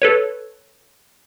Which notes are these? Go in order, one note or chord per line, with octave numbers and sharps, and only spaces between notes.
A4 B4 C#5